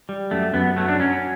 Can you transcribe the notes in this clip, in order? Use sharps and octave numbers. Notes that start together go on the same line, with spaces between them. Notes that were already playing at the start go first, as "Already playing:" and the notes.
G3
F#2 A3
F#2 B3
F#3 A3
D4
F#3 C#4